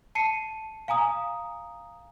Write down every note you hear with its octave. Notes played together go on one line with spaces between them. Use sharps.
A5 C7 C#7 D#7
F5 G#5 A#5 D#6